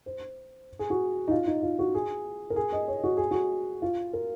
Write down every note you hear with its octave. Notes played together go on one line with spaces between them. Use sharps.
C5
G#4
F#4
D#4
F4
D#4
F4
F#4
G#4
A#4
G#4
D#5
C#5
F#4
G#4
F#4
F4
A#4